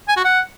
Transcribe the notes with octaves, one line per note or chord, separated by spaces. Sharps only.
G#5
F#4
F#5